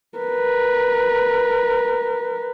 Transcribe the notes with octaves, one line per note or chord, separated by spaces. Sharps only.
A#4 B4